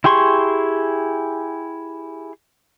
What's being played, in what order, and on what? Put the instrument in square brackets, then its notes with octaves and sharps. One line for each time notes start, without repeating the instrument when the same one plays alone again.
[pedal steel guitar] E4 G4 G#4 C6 C#6